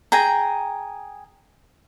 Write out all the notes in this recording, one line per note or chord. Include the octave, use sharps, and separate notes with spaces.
G#4 G5 A#5